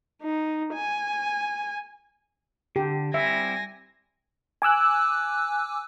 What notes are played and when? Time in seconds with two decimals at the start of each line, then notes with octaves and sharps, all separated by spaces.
0.22 D#4
0.74 G#5
2.76 D3 G4
3.14 G3 C4 E4 E5 G#5 A#6
4.62 G#5 D6 E6 F#6